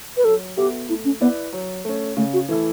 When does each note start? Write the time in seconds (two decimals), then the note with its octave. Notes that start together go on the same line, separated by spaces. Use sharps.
0.17 B4
0.25 F#3 A4
0.57 B3 F#4 G4 A4 E5
0.88 A3 E4
1.05 C#4
1.20 B3 E4 B4 D5
1.53 F#3
1.85 A3 C#4
2.17 C#3 A3
2.33 F#4
2.48 E3 A3 E4 A4